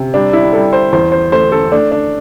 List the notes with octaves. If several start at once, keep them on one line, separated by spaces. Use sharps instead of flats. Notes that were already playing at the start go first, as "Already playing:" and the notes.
Already playing: C3
G3 D4
E4
G3 A4
C5
E2 C5
C5
A3 C5
A4
A3 D4
D4